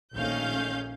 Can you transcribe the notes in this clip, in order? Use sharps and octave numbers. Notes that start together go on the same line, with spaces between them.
A#1 D#3 A3 C#4 F5 G6